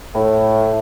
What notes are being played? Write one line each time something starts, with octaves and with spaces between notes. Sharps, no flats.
A2